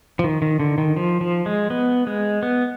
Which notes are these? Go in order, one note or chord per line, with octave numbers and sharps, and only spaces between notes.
F3
D#3
D#3
D3
D#3
F3
F3
G#3
B3
G#3
B3